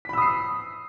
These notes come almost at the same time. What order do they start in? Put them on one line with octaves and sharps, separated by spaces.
B6 B5 E6 D#6 C7